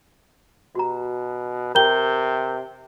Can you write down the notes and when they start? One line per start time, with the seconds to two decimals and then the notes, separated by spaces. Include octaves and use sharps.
0.75 B2 F#4 G4 A#5
1.75 C3 G4 A#4 G5 A#5 G6 G7